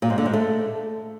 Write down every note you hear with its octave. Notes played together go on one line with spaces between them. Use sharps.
A#2
G#2
D3
G#2
A3